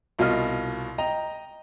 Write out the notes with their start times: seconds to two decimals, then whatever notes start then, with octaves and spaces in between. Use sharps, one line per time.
0.19 C2 B2 F4 D#5 F6
0.98 D#5 G5 A#5